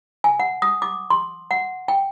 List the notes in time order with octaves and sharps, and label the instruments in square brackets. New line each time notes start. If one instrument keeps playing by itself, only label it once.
[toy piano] G#5
F#5
D#6
D6
C6
F#5
G5